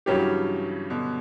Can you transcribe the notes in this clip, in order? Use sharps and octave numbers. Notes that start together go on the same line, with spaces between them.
G2 C#3 E3 F#3 C#4 G4
B2 D3